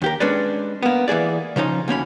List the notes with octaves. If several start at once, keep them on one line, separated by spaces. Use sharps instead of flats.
D#2 G4 A#4
G#3 C#4 D4 B4 D5
A#3 B3
E3 A#3 G#4 D5
C#3 F3 C#4 D#4
D2 A#3 C#4 B5